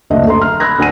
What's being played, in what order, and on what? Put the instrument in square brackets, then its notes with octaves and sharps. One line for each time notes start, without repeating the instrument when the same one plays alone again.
[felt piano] F#1 D2 D4 D#5 E5
A4 A#5 C6
F6
B5 E6 F#6 G#6 A#6
D2 D4 F#5 G#5 E6 D#7